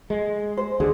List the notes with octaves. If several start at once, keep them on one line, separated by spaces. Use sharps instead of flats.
G#3
C5
D#2 D3 G#4